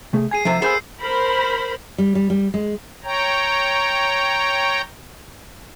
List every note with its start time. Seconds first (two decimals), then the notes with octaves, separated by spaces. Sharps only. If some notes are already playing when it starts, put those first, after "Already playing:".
0.13 C3 A3 G#4
0.31 G#4 G#5 G#6 C7 D#7
0.45 C3 F3 A3 D4 C5
0.62 B3 G#4 A#4 C5 G#5 E6 G6 C7
1.02 A#4 C5 B5
1.98 G3
2.15 G3
2.30 G3
2.54 G#3
3.04 C#5 G5 A#5